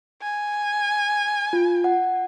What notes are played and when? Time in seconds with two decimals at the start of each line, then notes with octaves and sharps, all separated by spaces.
0.22 G#5
1.53 F4
1.84 F#5